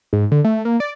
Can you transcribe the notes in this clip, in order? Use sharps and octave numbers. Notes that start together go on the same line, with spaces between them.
G#2
D3
A3
A#3
D5